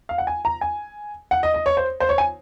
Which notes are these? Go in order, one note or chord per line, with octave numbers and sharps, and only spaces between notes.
F5
F#5
G#5
A#5
G#5
F#5
D#5
D#5
C#5
C5
C5
C#5
G#5